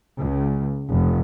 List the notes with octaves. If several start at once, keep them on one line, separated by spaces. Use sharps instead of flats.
C#2
F1